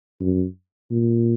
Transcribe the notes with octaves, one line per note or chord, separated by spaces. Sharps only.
F#2
A#2